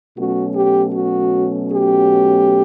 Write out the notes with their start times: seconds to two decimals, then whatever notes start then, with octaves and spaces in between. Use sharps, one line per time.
0.16 B2 F#3 A3 C#4 F#4
0.55 G4
0.93 F#4
1.71 G4